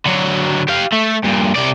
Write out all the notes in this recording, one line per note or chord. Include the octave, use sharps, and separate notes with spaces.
D3 F#3
G4 F5
A3
G2 A#2
C3 D5